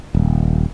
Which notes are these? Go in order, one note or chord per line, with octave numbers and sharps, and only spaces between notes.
D#1